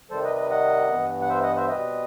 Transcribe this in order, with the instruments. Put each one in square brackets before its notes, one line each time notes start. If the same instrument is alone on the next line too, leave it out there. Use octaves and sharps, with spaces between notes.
[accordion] C3 D#3 G3 A4 C5
B4 D#5
B4 D#5
D#5 F#5
G2 E3 B3
F#5
C5 E5
D#5 F#5
C5 E5
B2 G3 C4 B4 D#5